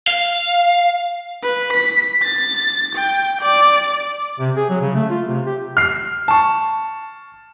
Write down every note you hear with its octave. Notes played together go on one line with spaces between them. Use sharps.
F5
B4
B6
A6
G5
D5
C3
G#4
F#3
C#3
A3
F4
C3
G4
F6 C7
A5 C#6